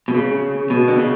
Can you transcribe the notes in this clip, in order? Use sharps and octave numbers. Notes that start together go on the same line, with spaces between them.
B2
C#3
B2
D3
C#3